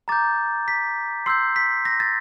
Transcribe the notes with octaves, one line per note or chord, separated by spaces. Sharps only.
A#5 D6 G6 A6
B6
C6 E6 G6 C7
B6
A#6
A6